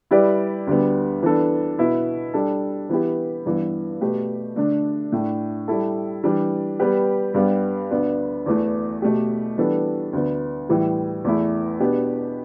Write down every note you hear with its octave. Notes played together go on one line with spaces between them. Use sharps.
G3 E4 G4 B4 D5
D2 D3 G3 B3
E3 B3 D4 A4
B2 B3 E4
G3 D4 A4
E3 B3 E4 G4
G2 E3 B3
B2 A3 G4 B4
D3 A3 D4
A2 A3 D4
G3 E4 A4
E3 G3 D4
G3 B3 G4 B4
G2 G3 B3
D2 D3 B3
E2 E3 A3
B2 A3 G4
E3 G3 B3 D4 A4
D2 D3 B3
A2 E3 G3
E2 E3 A3 E4
B2 B3 D4 G4